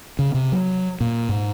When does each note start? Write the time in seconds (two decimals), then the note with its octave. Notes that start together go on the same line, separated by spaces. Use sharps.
0.19 C#3
0.34 C3
0.52 F#3
1.01 A#2
1.29 G#2